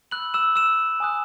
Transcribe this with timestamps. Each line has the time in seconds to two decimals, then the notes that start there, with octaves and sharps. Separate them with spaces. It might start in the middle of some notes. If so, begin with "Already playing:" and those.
0.11 B5 E6 F#6 F#7
0.34 E6 E7
0.56 E6 E7
1.00 G#5 D#6 F#6